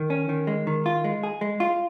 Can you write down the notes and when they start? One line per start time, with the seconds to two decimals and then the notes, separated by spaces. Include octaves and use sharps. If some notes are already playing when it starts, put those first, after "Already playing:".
Already playing: D#3
0.10 C#4
0.29 D#3
0.47 G#3
0.67 D#3
0.86 F4
1.04 G#3
1.23 G#4
1.41 G#3
1.60 F4